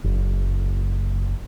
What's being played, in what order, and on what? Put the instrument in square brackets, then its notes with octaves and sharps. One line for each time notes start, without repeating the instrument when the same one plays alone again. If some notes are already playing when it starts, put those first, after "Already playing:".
[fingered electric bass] F#1